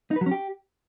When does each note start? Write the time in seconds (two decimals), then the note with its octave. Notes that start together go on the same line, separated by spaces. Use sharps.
0.11 D#4
0.16 B4
0.21 F#3
0.26 C#4
0.31 G4